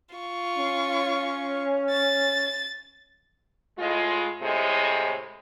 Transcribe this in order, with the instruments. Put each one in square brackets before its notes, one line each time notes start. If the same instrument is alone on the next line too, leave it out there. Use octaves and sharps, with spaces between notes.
[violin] F4 C#6
[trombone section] C#4
[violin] A6
[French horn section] A2 G#3 F4
A2 C3 G#3